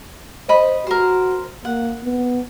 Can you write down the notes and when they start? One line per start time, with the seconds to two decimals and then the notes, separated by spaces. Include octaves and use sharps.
0.49 C5 D#5 B5
0.87 F#4 A#4 C5
1.65 A#3 F#5
2.04 B3